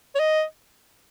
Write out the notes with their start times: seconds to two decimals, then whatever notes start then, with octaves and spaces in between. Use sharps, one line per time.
0.15 C#5
0.19 D#5